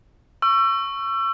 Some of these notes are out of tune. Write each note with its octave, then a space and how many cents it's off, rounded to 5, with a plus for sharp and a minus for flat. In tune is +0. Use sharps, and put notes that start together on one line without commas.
C#6 +0 E6 +30